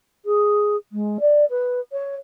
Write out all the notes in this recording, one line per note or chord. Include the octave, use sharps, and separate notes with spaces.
G#4
G#3
D5
B4
C#5